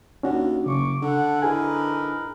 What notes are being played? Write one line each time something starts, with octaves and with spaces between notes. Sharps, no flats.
D#2 C#4 D4 F#4
F#1 C#3 C#6 D6
D3 A4 F#5
D#4 E4 G#4 A#4 B4 G#5